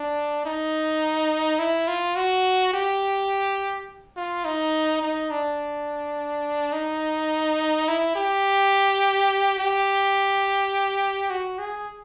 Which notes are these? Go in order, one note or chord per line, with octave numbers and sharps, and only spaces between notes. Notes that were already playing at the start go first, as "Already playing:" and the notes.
Already playing: D4
D#4
E4
F4
F#4
G4
F4
D#4
D#4
D4
D#4
E4
G4
G4
F#4
G#4